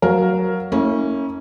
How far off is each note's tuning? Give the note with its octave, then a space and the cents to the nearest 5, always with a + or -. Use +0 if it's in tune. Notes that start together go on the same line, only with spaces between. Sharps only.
F#3 +0 A#4 +5 F5 +0
A#3 -30 C#4 -10 E4 -40